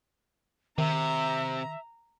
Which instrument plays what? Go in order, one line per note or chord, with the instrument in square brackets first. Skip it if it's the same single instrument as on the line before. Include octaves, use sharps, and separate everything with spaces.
[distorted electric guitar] C3 [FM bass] D#3 [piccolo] E5 [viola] A#5